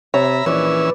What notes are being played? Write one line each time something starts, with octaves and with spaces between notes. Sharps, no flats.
C3 C#5 E5 A#5 B5
A#1 E3 C#4 B4 D5 E6